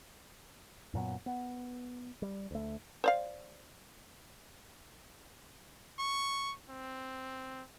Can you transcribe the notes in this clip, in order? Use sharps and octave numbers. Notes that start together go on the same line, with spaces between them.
F#2 A#2 F#3 B3
B3
G3
D2 A3
C5 D5 F5
C#6
C4